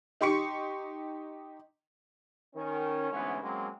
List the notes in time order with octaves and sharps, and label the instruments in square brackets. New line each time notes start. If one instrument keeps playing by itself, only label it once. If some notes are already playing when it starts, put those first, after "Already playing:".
[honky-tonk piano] D#4 G4 C6 C#6 C#7
[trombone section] D#3 C#4
D2 G#2 E3 B3 C#4
F#3 G#3 A#3 C4 C#4